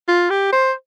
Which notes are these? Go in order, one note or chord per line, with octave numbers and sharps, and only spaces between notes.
F4
G4
C5